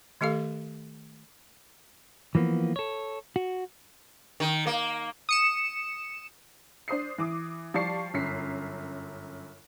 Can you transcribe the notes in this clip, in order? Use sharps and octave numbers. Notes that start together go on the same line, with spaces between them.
D#3 A3 G4 A4 F5
E3 F3 A#3 B3
A4 C#5
F#4
D#3
A#3
D#6 C#7 E7
D4 C5 D#6 C7
E3 D6 D#6
F3 G3 D5 A5 C#6 C7
G1 F#2 B6 C7